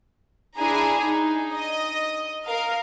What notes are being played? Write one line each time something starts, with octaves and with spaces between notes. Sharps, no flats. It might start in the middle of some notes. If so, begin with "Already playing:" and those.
D4 E4 G#4 G#5 A#5
D#4
D#5
A#4 F5